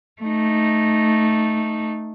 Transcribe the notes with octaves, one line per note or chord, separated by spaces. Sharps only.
A3 D#4